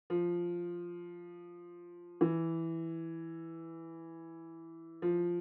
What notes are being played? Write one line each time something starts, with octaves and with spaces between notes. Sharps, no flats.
F3
E3
F3